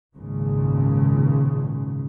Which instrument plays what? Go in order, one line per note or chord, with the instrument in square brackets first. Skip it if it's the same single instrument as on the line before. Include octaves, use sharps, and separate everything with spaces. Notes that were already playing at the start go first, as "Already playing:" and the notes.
[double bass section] G#1 C#2 A#2 C#3